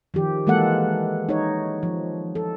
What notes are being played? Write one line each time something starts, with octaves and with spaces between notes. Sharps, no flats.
D#3 F3 G4
E3 G#3 A#3 A4 F#5
D#4 C#5
F3
A4